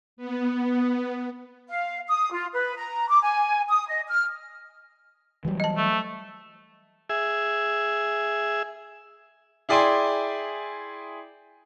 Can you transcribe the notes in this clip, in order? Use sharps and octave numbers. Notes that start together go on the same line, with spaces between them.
B3
F5
D#6
F4
B4
A#5
D6
G#5
D#6
D#5
F6
E3 F#3 G3
D#5 A5
A3
G#4 E5
E4 G#4 D5 G5 G#5 C6